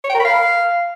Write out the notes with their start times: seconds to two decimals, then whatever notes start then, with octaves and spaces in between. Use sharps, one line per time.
0.04 C#5
0.09 G5
0.15 A#4
0.20 B5
0.25 F5